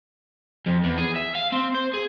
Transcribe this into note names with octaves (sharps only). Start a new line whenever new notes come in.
F2
E2
G#4
E5
F5
C4
C5
G#4